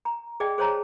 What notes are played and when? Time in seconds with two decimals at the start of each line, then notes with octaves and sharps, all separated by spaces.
0.05 A#5
0.40 G#4 D5 D#5 G5
0.58 G#4 C5 C#5 A5 A#5